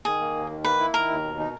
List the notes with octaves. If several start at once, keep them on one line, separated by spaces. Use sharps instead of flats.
D#3 G#4
A#3
D#2
D#3
A#3 B4
E4
D#3 A#4
D#2
B2
D#4